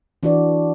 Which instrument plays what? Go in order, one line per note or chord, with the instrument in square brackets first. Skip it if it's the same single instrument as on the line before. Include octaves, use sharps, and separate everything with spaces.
[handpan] E3 D4 F#4 D5